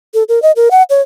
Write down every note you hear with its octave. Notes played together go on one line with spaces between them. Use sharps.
A4
A#4
D#5
A#4
F#5
C#5